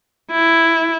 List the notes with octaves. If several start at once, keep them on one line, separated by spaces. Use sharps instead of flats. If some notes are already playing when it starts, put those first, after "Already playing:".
E4